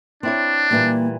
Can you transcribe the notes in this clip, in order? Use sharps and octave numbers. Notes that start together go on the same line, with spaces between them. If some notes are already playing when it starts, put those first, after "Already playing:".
C4 D4 E4 C#5
A#2 E3 G3 A#3